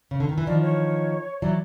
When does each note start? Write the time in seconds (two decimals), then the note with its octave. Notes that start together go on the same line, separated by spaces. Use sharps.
0.11 C#3
0.20 D3
0.29 D#3
0.38 E3
0.47 D#3 F3 D5
0.63 C#5
1.41 E3 F#3 D5